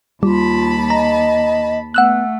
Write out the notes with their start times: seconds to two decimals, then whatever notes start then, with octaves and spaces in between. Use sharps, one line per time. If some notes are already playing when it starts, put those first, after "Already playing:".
0.23 D#2 G3 F4 A5 B5
0.90 D#5 A#5
1.94 A3 B3 F#5 E6 F#6